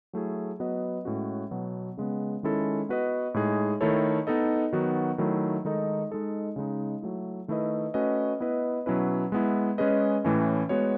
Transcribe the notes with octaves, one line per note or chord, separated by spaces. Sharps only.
F#3 A3 E4 G#4
F#3 B3 F#4 B4 D#5
A2 G#3 C#4 F#4
B2 F#3 B3
C#3 G#3 B3
D#3 G#3 C#4 E4 A4
B3 F#4 B4 D#5
A2 G#3 D#4 G#4
D#3 A3 E4 A4 C#5
B3 D#4 A4 D#5
D#3 F#3 B3 F#4
D#3 F#3 A3 E4
D#3 G#3 D#4 A4 D#5
G#3 D#4 A4 D#5
C#3 G#3 D#4
F#3 A3 E4
D#3 A3 E4 B4 D#5
A3 C#4 F#4 B4 D#5
B3 E4 B4 D#5
B2 F#3 C#4 E4 B4
G#3 B3 E4
G#3 C#4 G#4 B4 D#5
A2 E3 A3 C#4
G#3 B3 F#4 C#5